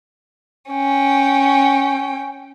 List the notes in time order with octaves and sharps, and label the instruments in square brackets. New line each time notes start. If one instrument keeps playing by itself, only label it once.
[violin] C#4 G5